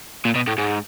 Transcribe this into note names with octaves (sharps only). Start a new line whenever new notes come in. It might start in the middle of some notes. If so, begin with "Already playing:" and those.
A#2
B2
A2
G#2